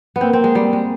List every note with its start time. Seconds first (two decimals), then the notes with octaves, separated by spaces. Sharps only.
0.16 B3
0.21 A#3 C4
0.33 C4
0.44 G#3
0.55 G3
0.73 G#3